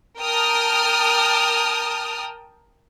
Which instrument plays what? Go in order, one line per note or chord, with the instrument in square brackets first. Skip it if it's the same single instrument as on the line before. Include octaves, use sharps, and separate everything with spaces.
[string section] A#4 G5 A5 D#6 F6